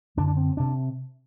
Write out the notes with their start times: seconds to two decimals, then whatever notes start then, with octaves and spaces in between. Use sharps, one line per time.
0.17 F#2 D3 D4
0.27 D4
0.37 C4
0.57 C3 D4